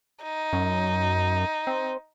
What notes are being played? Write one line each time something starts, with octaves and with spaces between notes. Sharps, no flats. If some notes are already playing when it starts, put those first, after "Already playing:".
D#4
F#2
C4